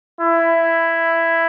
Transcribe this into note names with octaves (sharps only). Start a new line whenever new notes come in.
E4